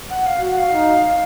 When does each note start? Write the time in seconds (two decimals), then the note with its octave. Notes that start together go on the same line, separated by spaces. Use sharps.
0.09 F#5
0.26 F5
0.40 F#4
0.52 F#5
0.57 F5
0.73 D#4